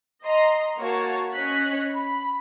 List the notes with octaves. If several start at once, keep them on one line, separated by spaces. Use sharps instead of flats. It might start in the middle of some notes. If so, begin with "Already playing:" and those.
D#5 A#5 C6
A#3 F#4 C#5 A5
C#4 C#5 D#5 F#6 B6
B5